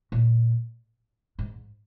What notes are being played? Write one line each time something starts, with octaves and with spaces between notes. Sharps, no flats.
A#2
G#2